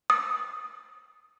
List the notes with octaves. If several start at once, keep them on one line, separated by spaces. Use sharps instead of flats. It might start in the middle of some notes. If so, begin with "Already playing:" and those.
D#6